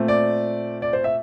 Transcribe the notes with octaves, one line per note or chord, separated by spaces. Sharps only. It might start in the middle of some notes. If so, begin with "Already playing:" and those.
Already playing: A#2 A3 C4
D5
D5
C5
E5